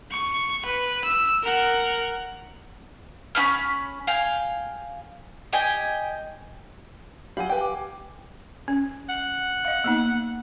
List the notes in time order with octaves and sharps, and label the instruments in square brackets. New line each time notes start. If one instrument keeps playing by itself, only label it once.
[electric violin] C#6
B4
E6
A#4 F#5
[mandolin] C#4 D#4 B5 F6
F5 G5 G#5
G4 D#5 G5 G#5
[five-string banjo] F#3 B5 [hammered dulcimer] G4 [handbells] F5 G#5
[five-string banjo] B4 G5
[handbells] D6
[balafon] C#4
[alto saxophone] F#5
[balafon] D#5 F5
A#3 B3 D#4